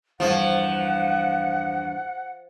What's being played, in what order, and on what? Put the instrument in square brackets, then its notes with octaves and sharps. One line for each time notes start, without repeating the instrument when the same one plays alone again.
[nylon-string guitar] E2 G2 C#5 [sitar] F3 [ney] F#5